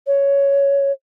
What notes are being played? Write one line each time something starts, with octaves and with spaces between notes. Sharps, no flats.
C#5